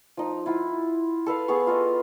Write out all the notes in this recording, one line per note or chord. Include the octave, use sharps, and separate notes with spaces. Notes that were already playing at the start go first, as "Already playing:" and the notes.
F3 D#4
E4 F4 F#5
A4 B4 F5
B3 G#4 F5 C#6
F4 A4 D#5